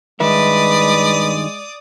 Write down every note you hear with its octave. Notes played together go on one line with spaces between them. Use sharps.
G2 D#3 G#3 B4 D5 E5 D#6